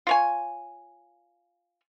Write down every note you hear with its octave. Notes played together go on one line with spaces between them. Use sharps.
F4 C#5 G#5